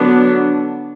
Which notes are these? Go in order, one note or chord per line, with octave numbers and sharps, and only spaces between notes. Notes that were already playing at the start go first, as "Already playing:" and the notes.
Already playing: D3 F#3 B3 D4